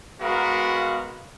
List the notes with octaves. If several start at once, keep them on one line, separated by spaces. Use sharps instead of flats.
G#3 B3 F#4 A#4 F5 B5